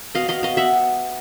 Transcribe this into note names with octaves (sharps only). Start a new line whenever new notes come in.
B2 D#5 F5
B2 D#5 F5
B2 D#5 F5
B3 E5 F#5